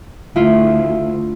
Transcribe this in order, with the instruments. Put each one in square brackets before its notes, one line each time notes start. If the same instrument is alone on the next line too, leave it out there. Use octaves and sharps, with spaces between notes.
[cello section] D2 [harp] E4 F4